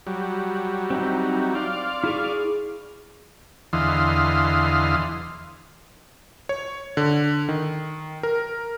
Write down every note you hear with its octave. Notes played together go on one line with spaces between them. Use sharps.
F#3 G3
C4 D#4 E4
D5 F5 C6
E4 G#4 C#6
E2 D3 E3 D#5 F5 C6
C#5
D3
D#3
A#4